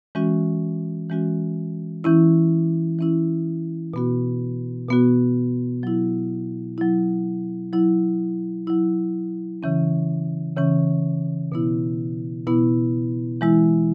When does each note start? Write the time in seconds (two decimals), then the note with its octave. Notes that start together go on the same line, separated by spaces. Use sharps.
0.15 E3 G#3 C#4 F#4
1.10 E3 G#3 C#4 F#4
2.04 E3 C#4 E4
2.99 E3 C#4 E4
3.94 B2 B3 F#4
4.89 B2 B3 F#4
5.83 F#3 E4
6.78 F#3 E4
7.73 F#3 E4
8.67 F#3 E4
9.63 C#3 E3 C#4
10.57 C#3 E3 C#4
11.52 B2 B3 E4
12.47 B2 B3 E4
13.41 E3 G#3 E4